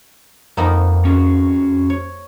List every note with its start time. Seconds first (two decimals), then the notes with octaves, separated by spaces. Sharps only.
0.57 F2 A#3 B3 D#4
1.05 C#4 F#4 G#4
1.90 C#5